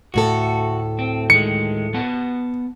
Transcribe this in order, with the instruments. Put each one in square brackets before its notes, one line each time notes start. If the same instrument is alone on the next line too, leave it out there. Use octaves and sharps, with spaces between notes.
[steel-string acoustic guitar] D2 A2 A4 [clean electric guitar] F#4
[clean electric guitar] C4
[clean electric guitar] D#3 G#3 [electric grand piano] C#7
[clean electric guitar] B3 F#5 A5